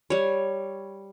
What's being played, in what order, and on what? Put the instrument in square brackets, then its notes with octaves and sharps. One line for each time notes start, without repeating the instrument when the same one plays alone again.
[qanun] G3 C#5